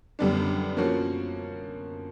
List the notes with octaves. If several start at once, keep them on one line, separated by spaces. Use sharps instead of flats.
F#2 D3 G3 B3 D4
F3 A#3 C#4 F#4